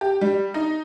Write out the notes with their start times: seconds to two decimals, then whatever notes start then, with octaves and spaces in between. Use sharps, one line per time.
0.01 G4
0.21 G3
0.54 D#4